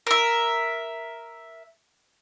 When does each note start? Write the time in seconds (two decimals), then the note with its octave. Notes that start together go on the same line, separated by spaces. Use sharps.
0.07 A#4 E5